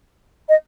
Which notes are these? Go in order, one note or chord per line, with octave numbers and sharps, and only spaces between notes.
D#5